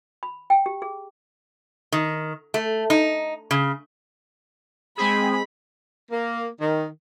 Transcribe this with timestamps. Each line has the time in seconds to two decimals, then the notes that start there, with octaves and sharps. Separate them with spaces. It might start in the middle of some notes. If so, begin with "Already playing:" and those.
0.23 B5
0.50 G5
0.66 G4
0.82 G#4
1.92 D#3
2.54 A3
2.90 D#4
3.51 C#3
4.98 G#3 C4 G#4 B5
6.12 A#3
6.60 D#3